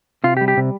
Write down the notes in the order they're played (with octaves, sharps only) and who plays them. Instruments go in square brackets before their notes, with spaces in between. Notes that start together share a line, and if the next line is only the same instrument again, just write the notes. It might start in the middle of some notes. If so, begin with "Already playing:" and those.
[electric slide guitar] C3 F4
G4
G3
G4
C3